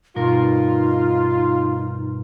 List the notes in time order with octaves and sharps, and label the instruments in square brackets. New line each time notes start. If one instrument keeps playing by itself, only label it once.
[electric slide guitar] G2 B2 A#4 [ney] D#4 [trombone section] F4